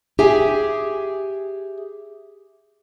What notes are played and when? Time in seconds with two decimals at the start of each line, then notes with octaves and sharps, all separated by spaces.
0.19 G4 G#4 E5 G#5